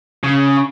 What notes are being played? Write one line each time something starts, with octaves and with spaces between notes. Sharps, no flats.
C#3